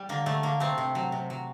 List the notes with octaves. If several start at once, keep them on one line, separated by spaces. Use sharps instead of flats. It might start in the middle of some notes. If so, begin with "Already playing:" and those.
Already playing: G3
D3 A#3
D3 A3
D3 A#3
C3 A3 C4
C3
F#3
C3
F#3